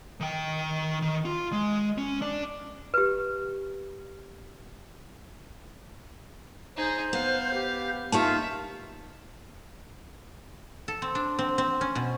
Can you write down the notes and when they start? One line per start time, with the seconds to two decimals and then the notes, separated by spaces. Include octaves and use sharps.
0.20 D#3 G5
1.02 D#3
1.25 F4
1.52 G#3
1.98 C#4
2.22 D4 D5
2.94 G4 B4
6.76 D#4 G#4 C5
7.13 B3 F5
7.54 G4
8.12 A#3 C#4 D#4 F4 G4 E5 A5
10.88 A4
11.02 C4
11.15 D4
11.39 C4
11.58 C4
11.81 C#4
11.95 B2